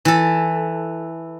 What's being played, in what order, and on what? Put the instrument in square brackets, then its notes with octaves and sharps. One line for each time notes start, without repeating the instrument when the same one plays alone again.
[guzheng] E3 A4